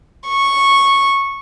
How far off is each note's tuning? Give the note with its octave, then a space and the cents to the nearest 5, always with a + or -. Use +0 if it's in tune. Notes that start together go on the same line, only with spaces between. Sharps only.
C#6 -10